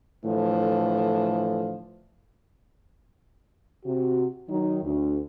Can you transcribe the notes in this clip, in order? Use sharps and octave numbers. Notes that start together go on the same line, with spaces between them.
A2 D3 E3 F3
C3 F#4
D#3 F#3 D#4
D2